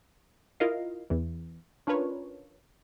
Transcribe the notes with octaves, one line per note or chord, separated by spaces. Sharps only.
E4 F4 A#4 D#5 F5
E2 E3
C#4 D4 F4 A#4 B4 C#5